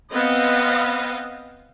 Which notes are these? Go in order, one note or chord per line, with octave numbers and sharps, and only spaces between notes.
B3 C4 D#5 F5